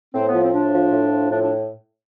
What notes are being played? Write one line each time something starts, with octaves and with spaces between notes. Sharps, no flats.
A2 C4
B3
F3
C4
A2 D4
F3
A2
F3
A2 D4
D4